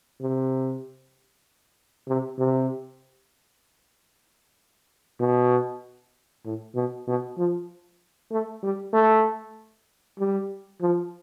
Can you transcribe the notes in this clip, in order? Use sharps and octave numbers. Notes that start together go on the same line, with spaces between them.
C3
C3
C3
B2
A2
B2
B2
F3
A3
G3
A3
G3
F3